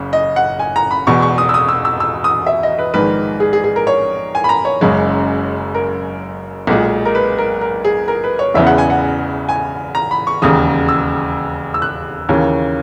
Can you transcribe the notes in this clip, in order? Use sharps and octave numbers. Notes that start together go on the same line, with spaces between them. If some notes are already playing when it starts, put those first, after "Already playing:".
Already playing: F#1 C#3
D#5
F#5
G#5
A#5
B5
E1 E2 B2 C#6
C#6
D#6
E6
D#6
E6
E6
E6
D#6
E5
D#5
B4
A#1 G#2 D#3 B4
G#4
G#4
G#4
A#4
C#5
G#5
B5
A#5
C#5
F#1 F#2 C#3 G#3
A#4
B1 A#2 G#3
A#4
B4
A#4
A#4
G#4
A#4
B4
C#5
E1 E2 C#3 E3 B3 E5
F#5
G#5
F#5
G#5
A#5
B5
C#6
E1 D#2 C#3 D#6
E6
E6
F#6
D#2 C#3 E3 A#3 C#4